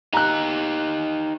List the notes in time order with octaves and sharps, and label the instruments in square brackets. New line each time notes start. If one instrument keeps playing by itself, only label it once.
[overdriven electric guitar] D#4 G4 [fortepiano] A#5 F#6